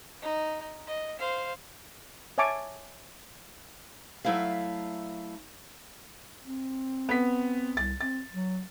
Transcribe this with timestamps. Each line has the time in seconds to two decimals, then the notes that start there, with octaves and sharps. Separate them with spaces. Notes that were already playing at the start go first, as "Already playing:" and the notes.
0.22 D#4
0.86 D#5
1.19 C5 F5
2.38 C#5 E5 G#5 A5 D6
4.25 F#3 A3 E4 E5 F5
6.44 C4
7.09 B3 B6
7.77 C2 A6
8.01 C4 A6
8.34 F#3